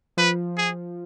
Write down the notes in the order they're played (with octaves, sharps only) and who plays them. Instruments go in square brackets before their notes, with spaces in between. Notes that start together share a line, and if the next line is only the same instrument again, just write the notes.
[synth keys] F3 [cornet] B4
[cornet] G#4